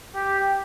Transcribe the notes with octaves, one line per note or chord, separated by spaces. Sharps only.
G4